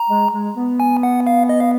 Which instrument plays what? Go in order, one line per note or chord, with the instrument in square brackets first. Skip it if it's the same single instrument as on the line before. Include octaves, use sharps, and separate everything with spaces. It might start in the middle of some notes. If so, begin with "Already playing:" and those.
Already playing: [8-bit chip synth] A#5
[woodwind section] G#3
G#3
B3
[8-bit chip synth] G#5
F#5
F5
D#5
F5